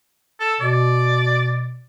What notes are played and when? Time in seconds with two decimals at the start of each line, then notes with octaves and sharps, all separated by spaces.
0.40 A4 E6
0.61 B2 D5